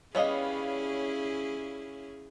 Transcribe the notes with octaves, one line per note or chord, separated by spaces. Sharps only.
G3 B3 C#4 E4 G#4 C#5 D#5 F5